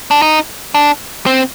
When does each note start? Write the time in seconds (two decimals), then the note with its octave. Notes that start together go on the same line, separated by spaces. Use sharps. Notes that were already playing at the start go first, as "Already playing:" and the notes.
0.11 D4
0.22 D#4
0.74 D4
1.26 C4